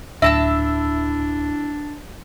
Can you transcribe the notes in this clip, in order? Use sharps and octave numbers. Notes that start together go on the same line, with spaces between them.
D1 D4 E4 E5 A5 E6